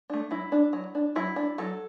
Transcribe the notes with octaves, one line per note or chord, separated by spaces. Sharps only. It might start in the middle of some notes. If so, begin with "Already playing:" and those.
A3 D4
F#3 E4
D4
F#3
D4
F#3 E4
D4
F#3 A4